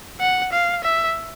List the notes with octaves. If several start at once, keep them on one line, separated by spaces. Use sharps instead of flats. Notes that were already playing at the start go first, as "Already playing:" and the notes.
F#5
F5
E5